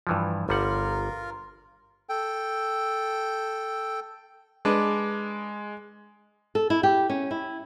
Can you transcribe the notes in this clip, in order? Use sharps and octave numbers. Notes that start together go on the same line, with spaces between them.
G2 E3 F3
G1 G3 F4 A#4 F#5
A4 G5
G#3 D4 B4
A4
E4
G4
C#4
E4